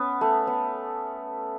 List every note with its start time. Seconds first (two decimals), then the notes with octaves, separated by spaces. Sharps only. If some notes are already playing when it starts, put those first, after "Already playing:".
Already playing: B3 C#4
0.21 A3
0.47 B3